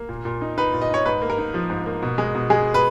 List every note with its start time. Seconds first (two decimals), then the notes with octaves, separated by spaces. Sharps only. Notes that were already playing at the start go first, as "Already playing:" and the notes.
Already playing: A#3
0.09 A#2
0.25 A#2
0.41 D#4
0.58 D#4 B4
0.73 A#2
0.81 D#5
0.90 D#4 C#5
1.05 G#2 B4
1.22 A#3
1.30 A#4
1.38 D#4
1.54 F3
1.70 G#2
1.86 A#3
2.02 B2
2.18 G#3
2.35 B2
2.50 G#3 G#4
2.74 B4